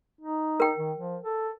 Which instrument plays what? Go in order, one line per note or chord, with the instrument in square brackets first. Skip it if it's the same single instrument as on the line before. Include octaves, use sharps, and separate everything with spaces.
[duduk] D#4
[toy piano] A#4 G5
[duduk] D#3
F3
A4